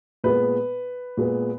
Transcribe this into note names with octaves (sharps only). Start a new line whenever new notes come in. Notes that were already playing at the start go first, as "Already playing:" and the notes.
A#2 G#3 B3 B4
A#2 G#3 B3